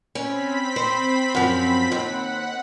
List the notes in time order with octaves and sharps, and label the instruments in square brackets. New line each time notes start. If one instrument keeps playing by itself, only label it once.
[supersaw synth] C4 B5 B6 [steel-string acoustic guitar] C#4
[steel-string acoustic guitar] C5
F#2 F3
[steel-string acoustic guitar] D#2 [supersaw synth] F#5